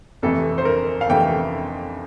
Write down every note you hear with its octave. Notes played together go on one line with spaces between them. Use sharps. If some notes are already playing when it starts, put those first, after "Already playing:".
F2 C3 E3 A3 A4
C5
A#4
F5
F2 C3 E3 A3 G5